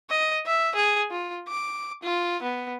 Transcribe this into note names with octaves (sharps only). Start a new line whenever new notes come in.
D#5
E5
G#4
F4
D6
F4
B3